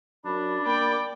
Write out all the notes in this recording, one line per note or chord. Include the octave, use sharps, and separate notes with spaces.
F#2 D4 B5
A#3 D5 G5